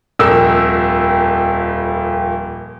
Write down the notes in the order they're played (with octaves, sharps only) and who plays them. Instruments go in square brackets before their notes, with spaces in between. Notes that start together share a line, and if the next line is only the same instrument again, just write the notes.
[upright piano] D#1 F2 A#4 E6